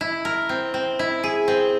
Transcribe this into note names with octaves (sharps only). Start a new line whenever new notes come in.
E4
A#4
C4
C4
E4
G#4
C4